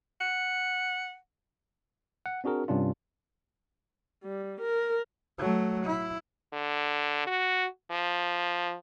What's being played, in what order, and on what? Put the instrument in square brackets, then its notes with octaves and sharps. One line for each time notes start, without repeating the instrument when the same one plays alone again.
[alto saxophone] F#5
[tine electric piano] F#5
C4 D4 F#4 G#4 A#4
G2 C3 C#4 D4 F4
[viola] G3
A#4
[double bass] F#3 A3
E4
[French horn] D3
F#4
F3